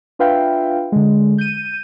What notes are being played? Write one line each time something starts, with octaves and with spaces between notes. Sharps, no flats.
D4 F4 B4 E5 F5 G5
D3 G#3
G6 D#7